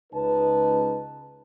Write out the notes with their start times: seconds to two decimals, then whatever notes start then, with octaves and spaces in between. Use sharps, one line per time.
0.13 C#2 D#4 B4 A5